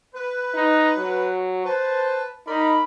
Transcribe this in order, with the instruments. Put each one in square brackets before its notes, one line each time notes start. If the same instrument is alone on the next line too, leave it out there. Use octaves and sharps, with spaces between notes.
[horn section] B4
[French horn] D#4
F#3
[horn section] B4 A5 [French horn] C5
[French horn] D#4 [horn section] A#4 D5 B5